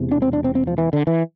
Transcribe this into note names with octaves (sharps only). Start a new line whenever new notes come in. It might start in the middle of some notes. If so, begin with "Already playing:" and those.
Already playing: E1 E2 C3
D4
C4
D4
C4
C4
F3
E3
D3
E3